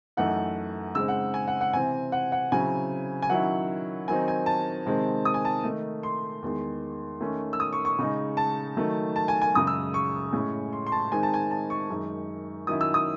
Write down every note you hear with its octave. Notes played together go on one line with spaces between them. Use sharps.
F#2 E3 A3 D#4 F#5
C#3 G#3 C4 D#4 E6
F#5
G#5
F#5
F#5
C3 E3 C4 G#5
F#5
F#5
C#3 F#3 C4 E4 G#5
G#5
D#3 F#3 C#4 E4 F#5
D#3 F#3 C4 D#4 G#5
G#5
A5
C3 D#3 G#3 C4
D#6
G#5
A5
D#3 A3 D#4
C6
E2 D#3 G#3
D#3 A3 C#4
E6
D#6
C#6
C#6
C#3 G#3 D#4
A5
D#3 F#3 A3
A5
G#5
G#5
F#2 C#3 G#3 D#6
E6
C#6
A2 G#3 C#4
C6
C6
A5
D#3 G#3 C4 D#4 G#5
A5
G#5
A5
C#6
F#2 D#3 G#3 D#4
D#3 F#3 C#4 E4 D#6
E6
D#6